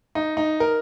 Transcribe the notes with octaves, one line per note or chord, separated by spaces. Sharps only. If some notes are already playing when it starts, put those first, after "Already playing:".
D#4
D#4
A#4